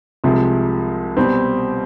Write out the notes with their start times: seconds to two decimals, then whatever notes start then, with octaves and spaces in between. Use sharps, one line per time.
0.24 C2 C3 F3 G#3
1.17 B2 G3 C4